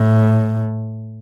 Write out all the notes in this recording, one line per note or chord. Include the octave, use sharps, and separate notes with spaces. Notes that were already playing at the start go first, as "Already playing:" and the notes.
Already playing: A2